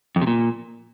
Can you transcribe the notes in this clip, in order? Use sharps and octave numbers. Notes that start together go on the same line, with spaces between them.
F2
C3
A#2